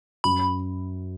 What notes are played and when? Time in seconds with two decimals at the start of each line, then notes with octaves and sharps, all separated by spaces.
0.24 F#2 B5